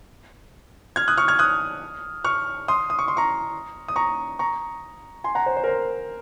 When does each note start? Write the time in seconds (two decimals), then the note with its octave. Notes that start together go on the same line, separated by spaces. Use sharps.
0.96 F6 G#6
1.08 D#6 F#6
1.18 C#6 F6
1.28 F6 G#6
1.39 D#6 F#6
2.24 C#6 F6
2.68 C6 D#6
2.90 D#6
2.99 C#6
3.08 C6
3.17 A#5 C#6
3.88 D#6
3.96 A#5 C#6
4.39 A#5 C#6
5.24 G#5 C6
5.35 F#5 A#5
5.46 C5
5.57 C5
5.64 A#4
5.67 C5